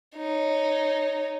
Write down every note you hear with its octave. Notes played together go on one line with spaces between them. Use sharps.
D#4 C#5